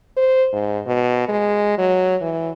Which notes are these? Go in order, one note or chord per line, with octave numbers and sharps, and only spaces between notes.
C5
G#2
B2
G#3
F#3
E3